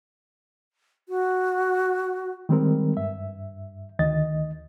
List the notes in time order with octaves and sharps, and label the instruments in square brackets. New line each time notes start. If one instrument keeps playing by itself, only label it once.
[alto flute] F#4
[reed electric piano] D#3 G3 G#3 C4 A#4
G2 E5
D2 D#3 D#5 A6